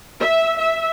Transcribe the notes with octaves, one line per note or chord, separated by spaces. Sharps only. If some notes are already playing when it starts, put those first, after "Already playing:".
E5
E5